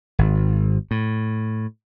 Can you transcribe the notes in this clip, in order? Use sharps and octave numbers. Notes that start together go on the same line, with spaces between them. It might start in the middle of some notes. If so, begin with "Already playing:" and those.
G#1
A2